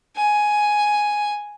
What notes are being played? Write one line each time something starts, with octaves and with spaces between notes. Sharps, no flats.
G#5